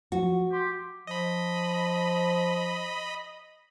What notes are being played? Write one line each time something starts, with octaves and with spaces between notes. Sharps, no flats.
F3 F#4
G4 C6
F3 D#5 B5